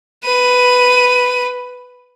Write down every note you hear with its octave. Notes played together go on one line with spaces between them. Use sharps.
B4 D#7